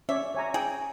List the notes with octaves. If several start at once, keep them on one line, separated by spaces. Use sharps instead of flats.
C#4 C#5 D5 E5
C#5 G#5 A#5
G#4 G5